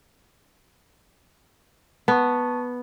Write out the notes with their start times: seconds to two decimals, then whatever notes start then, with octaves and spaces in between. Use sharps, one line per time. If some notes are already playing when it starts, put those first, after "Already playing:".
2.08 B3 A5 C#6